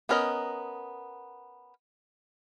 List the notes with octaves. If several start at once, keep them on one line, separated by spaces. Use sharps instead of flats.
B3 C#4 A#4 D5 D#5